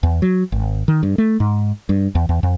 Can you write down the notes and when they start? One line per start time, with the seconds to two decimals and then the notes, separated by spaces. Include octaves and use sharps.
0.03 E2
0.22 F#3
0.52 G#1
0.88 D#3
1.03 G2
1.18 A3
1.40 G#2
1.89 G2
2.15 E2
2.29 E2
2.43 F2